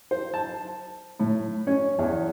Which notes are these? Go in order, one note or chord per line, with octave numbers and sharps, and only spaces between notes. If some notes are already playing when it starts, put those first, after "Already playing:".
C5
A5
A2
C#4
E2